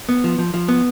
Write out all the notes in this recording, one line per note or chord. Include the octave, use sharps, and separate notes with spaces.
B3
F3
F3
F3
B3